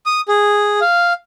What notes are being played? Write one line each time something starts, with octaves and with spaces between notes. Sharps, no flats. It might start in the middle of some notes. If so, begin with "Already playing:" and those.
D#6
G#4
F5